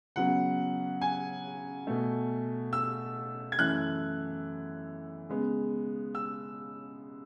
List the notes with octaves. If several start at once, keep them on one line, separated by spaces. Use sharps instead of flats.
C#3 F#3 B3 F#5
G#5
B2 A3
E6
G#6
F#2 E3 A3 F#6
C#3 G#3 B3
E6